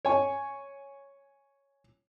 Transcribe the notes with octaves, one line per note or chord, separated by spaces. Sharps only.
C#5 G#5